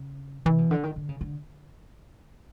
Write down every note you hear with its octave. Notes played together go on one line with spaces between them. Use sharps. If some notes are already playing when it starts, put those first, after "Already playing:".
Already playing: C#3
C3 E3
B2
D3
D#3
D3
C#3
D3